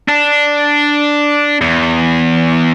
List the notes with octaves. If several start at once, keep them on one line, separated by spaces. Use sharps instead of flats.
D4
E2